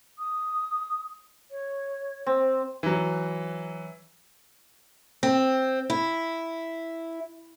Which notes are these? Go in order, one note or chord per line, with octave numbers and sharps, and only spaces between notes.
D#6
C#5
C4
E3 F#3
C4
E4